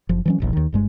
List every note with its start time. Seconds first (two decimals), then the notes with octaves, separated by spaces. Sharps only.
0.09 F#1 F3
0.26 E3 F#3 C#4
0.40 D#1 A#1 E2
0.53 D#2 D#3
0.73 G1 G2 G#3